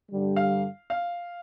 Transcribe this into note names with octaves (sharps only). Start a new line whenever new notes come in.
G2 D3 G3
F5
F5